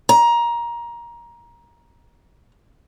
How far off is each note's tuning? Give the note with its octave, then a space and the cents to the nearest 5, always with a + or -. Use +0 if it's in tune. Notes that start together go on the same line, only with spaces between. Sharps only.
A#5 +20